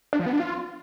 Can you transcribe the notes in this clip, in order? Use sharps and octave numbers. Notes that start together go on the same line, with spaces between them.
D4
F3
B3
D4
F4